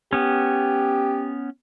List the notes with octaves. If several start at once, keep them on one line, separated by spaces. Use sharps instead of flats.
B3 C#4 G4